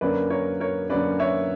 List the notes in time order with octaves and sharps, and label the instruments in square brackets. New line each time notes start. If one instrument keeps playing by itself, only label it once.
[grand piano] F#2 D3 A#3 C#4 B4 D5
A#4 C#5
A#4 C#5
F#2 D3 A#3 C#4 B4 D5
C#5 E5